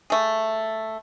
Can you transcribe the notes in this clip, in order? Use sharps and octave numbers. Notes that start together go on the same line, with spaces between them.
A3 G#4